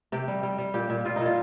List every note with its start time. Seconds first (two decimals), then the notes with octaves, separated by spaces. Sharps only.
0.12 C3 G4
0.28 G3
0.43 G3
0.58 G3
0.74 A#2 G4
0.90 A#2
1.05 G3 F4
1.16 D#4
1.21 A#2 F4